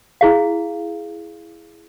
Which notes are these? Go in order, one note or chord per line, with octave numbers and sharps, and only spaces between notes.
E4 G#4 F5